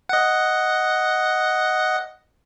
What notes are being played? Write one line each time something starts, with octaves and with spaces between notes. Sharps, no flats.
D#5 F#5